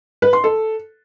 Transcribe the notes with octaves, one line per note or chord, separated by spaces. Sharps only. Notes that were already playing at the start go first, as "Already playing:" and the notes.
B4
C6
A4